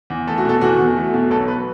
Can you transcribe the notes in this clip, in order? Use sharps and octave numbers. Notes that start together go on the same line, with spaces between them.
E2
A3 A4
F#4
B2 A4
E2 F#4
E2
A3
B2
B1 A4
B4